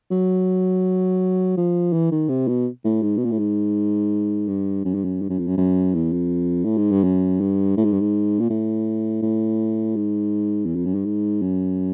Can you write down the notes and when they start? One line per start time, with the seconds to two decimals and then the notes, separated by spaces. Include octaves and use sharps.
0.11 F#3
1.57 F3
1.93 E3
2.11 D#3
2.29 C3
2.48 B2
2.84 A2
3.02 G#2
3.17 B2
3.25 A#2
3.32 A2
3.38 G#2
4.48 G2
4.85 F#2
4.94 G2
5.04 F#2
5.22 G2
5.30 F#2
5.38 F2
5.47 F#2
5.57 F#2
5.94 E2
6.13 F2
6.64 A2
6.77 G#2
6.91 G2
7.04 F#2
7.40 G2
7.77 A2
7.84 G#2
7.92 G2
8.00 G#2
8.39 A#2
8.50 A2
9.22 A2
9.96 G#2
10.66 E2
10.75 F2
10.85 F#2
10.95 G2
11.05 G#2
11.42 F#2